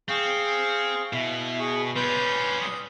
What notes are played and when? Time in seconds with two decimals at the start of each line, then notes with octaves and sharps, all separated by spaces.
0.09 C4 G#4 F5 C#6
1.13 B2 E4
1.60 G#4 C#6
1.96 G3 C#4 B4 C6 G6
2.61 D#6